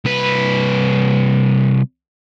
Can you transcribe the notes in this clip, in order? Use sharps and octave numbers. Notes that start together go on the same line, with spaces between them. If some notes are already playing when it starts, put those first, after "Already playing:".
C2 B4